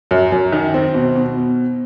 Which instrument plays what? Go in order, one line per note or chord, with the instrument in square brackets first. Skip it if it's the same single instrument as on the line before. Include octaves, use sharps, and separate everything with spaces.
[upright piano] F#2
F#2
D#3
C4
B2
B2